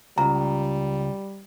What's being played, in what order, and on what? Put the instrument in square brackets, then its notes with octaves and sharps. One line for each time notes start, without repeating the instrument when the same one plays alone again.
[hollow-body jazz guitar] C#2 [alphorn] G3 [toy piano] A#5